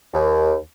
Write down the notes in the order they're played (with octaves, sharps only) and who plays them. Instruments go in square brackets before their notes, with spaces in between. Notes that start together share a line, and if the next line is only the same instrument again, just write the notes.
[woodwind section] D#2